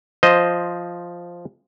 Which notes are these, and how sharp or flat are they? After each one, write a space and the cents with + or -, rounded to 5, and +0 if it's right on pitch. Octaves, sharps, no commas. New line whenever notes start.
F3 +0 C5 +0 D#5 +0